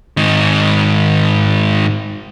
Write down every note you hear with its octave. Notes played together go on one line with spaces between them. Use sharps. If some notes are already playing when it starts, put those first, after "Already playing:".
G#2 D#3